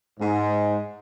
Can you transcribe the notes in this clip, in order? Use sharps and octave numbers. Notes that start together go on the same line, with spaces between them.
G#2